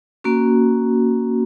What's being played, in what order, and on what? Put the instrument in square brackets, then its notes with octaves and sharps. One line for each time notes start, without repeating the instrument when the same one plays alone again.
[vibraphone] A#3 C#4 F#4